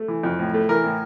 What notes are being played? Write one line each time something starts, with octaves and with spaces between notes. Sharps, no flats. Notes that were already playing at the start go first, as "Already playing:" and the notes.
Already playing: A3
E3
F2
A2
A3
E3 A#4
A2